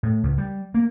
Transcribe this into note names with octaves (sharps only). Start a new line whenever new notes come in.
A2
C#2
G3
A#3